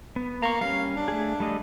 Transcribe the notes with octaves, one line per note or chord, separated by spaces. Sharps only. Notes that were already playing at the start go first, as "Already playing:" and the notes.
B3
A#3 A#5 C#6
G3 C#4 F5
D4
A3 G#4
G3 A3 D#5